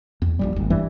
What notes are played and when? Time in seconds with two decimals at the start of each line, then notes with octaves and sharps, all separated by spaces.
0.22 E2
0.39 A#1 D#2 G3
0.56 D#1 G#1
0.70 G2 E3 G3